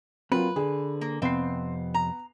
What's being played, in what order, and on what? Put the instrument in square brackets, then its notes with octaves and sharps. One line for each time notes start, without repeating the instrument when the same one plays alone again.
[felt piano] F#3 A#3 F4 [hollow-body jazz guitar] C4 B5 [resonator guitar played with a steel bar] B4
[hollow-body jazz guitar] D3 [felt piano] G#4
[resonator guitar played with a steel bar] A#3
[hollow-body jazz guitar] F2 C3 [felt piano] B3 C7 [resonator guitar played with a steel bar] C4
[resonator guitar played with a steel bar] A#5